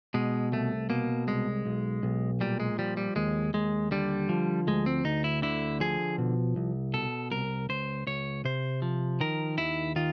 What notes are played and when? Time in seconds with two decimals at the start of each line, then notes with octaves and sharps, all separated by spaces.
0.14 B2 G#3
0.52 C2 A3
0.90 B2 A#3
1.27 C2 G#3
1.65 B1
2.03 B1
2.41 A#2 G3
2.60 G#3
2.79 F3 G3
2.97 G3
3.16 D#2 G#3
3.54 D#2 G#3
3.91 D3 G3
4.29 F3
4.67 D2 G#3
4.86 C4
5.05 D2 D#4
5.24 E4
5.42 D3 E4
5.80 F3 G#4
6.18 B2
6.56 C2
6.94 B2 A4
7.31 C2 A#4
7.69 C#2 C5
8.07 C#2 C#5
8.45 C3 C5
8.82 F3
9.21 D#3 A#4
9.58 D#2 E4
9.96 D#3 F4